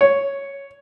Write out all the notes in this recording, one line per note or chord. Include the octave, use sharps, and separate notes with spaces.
C#5